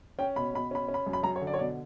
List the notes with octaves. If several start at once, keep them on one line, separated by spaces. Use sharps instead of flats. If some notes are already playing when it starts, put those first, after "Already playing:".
C#4 G5
B2 B5
B2 B5
C#4 B5
C#4
B5
F#2
B5
F#2 A#5
C#5
D3
D5
C#5
B2 D5